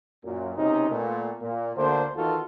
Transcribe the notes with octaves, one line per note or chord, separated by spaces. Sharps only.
F#2 A#2
C#2 C3 C#4 D#4
A#2 A3 B3
A#2
D2 D3 A#3 D4 C5
E2 D#3 E3 F4 F#4 A4